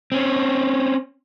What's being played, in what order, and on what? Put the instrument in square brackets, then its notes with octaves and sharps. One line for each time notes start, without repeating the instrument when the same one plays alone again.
[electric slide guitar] C4 C#4